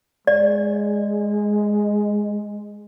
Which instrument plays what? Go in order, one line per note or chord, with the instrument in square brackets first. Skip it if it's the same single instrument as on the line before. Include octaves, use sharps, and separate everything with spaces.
[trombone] G#3 [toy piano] D5